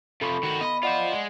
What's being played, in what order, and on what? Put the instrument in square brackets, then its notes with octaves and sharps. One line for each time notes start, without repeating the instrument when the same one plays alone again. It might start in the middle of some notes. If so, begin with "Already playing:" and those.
[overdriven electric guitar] C3 F3 [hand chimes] A4 B5 C#6
[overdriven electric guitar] D#3 F#4
[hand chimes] B3 B5 [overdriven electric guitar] D#5
[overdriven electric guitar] F4 C5 [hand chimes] D5 D#5 F#5
[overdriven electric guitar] G#3